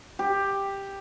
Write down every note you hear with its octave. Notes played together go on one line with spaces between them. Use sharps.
G4